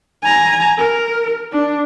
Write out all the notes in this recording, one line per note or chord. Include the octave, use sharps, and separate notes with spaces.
G#5 A#5
A#4
D4